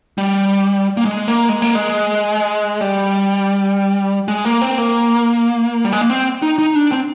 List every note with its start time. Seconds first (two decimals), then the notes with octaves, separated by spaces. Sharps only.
0.18 G3
0.97 A#3
1.05 G#3
1.28 A#3
1.49 G#3
1.62 A#3
1.75 G#3
2.81 G3
4.28 G#3
4.45 A#3
4.62 C4
4.78 A#3
5.85 G3
5.93 G#3
6.01 A#3
6.10 C4
6.42 D#4
6.59 D#4
6.75 D4
6.92 C4